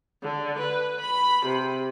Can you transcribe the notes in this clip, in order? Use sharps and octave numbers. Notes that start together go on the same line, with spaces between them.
D3
B4
B5
C3